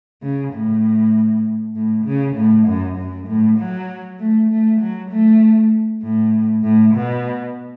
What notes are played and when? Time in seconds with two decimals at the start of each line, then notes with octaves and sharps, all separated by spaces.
0.22 C#3
0.53 A2
1.75 A2
2.05 C#3
2.36 A2
2.67 F#2
2.97 F#2
3.27 A2
3.58 F#3
4.19 A3
4.50 A3
4.80 F#3
5.11 A3
6.02 A2
6.63 A2
6.93 B2